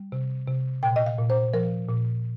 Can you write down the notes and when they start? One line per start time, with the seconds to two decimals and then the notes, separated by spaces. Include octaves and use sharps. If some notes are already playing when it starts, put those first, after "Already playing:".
Already playing: G3
0.12 C3
0.48 C3
0.83 A#2 G5
0.96 D#5
1.06 F5
1.18 A#2
1.30 C5
1.54 F3 A#4
1.89 A#2